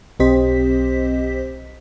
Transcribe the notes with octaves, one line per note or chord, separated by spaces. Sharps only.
B1 C4 G4 C5 D#5 B6